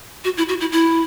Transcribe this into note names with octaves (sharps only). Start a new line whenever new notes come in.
F#4
E4
F#4
E4
E4